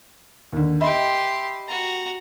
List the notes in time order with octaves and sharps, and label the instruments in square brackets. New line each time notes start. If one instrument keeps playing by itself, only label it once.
[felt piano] D#2 D3
[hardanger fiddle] G4 C6 [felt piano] D#5 E5 B5
[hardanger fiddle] F#4 A#5